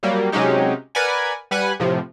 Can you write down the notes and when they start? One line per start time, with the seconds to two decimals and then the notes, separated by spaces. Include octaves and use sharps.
0.03 F#3 G3 A#3
0.32 C3 F#3 G#3 C#4 D#4 G4
0.95 A#4 B4 D5 F#5 G#5
1.51 G3 B4 F#5 G#5 F#6
1.80 A2 C3 F3